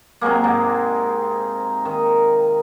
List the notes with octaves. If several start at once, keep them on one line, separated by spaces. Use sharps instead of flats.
C3 F#3 G#3 A#3
G#2
D#3